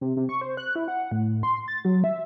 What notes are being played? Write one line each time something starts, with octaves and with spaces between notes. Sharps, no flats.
C3
C3
C#6
C5
F#6
E4
F#5
A2
C6
A6
F#3
E5